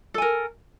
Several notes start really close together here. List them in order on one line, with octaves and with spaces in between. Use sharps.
A4 G#5 A#4